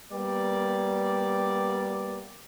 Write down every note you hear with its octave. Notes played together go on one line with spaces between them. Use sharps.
G3 A#3 B3 D5